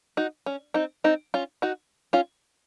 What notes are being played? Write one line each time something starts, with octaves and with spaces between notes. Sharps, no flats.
D#4 F#4
C#4
C4 D#4
C4 D#4
C#4 F4
D#4 F#4
C#4 F4